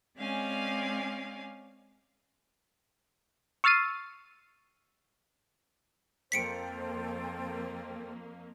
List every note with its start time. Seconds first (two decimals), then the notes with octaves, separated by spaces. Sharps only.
0.17 G#3 C4 C#4 D5 F5 G#5
3.64 C#6 E6 F6 A6 C7 D#7
6.32 F2 A#3 A4 C5 G5 B6 C#7 D7